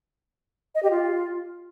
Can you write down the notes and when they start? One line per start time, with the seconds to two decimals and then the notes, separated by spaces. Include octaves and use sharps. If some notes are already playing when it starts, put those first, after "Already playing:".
0.75 D#5
0.83 G4
0.91 F4